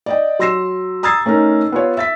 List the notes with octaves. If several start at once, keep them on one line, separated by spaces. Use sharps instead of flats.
D5 D#5 G5
F#3 C6 E6 A#6 C7 E7
A#5 D#6 E6 G#6 A6 C7
A3 C#4 D#4 A#4
B3 F4 C#5
E5 A6 B6